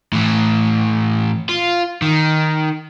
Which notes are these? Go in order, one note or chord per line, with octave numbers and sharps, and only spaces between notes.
A2 E3
F4
D#3